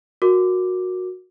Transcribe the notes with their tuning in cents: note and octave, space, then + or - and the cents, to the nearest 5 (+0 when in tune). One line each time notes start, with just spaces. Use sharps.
F#4 -15 A#4 +0 D6 +0